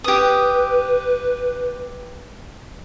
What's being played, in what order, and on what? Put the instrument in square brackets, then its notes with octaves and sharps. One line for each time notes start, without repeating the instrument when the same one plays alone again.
[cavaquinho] G4 D#6 [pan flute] B4